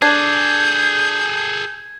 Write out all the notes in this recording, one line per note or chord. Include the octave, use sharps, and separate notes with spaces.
D4 G#4 A4 G6 G#6